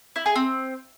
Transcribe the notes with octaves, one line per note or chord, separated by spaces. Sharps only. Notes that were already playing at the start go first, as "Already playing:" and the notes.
E4
G#4
C4